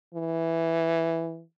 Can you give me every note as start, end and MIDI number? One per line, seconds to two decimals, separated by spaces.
0.14 1.43 52